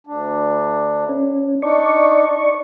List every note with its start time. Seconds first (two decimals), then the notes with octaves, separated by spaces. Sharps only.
0.07 D2 D4
1.09 C#4
1.62 D4 D#4 D5 C#6